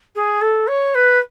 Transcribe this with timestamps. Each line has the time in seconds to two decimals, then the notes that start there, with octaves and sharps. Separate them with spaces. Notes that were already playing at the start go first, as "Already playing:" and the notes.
0.15 G#4
0.41 A4
0.67 C#5
0.95 B4